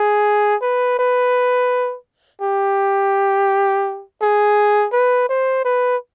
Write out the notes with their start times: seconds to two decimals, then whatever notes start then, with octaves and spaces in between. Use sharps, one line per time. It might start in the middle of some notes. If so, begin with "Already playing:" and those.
Already playing: G#4
0.62 B4
0.99 B4
2.42 G4
4.22 G#4
4.93 B4
5.29 C5
5.65 B4